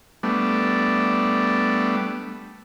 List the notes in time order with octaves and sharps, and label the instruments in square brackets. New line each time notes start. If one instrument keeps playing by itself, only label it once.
[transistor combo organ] G3 A3 B3 D4